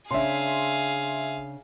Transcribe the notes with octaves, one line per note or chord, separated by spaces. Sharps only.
C#3 D4 G#4 E5 F5 C6